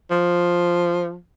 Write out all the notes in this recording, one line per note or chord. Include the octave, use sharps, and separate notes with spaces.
F3